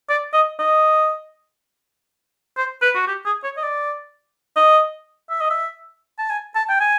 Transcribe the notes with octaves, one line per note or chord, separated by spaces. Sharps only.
D5
D#5
D#5
C5
B4
F#4
G4
G#4
C#5
D#5
D5
D#5
E5
D#5
E5
A5
G#5
A5
G5
G#5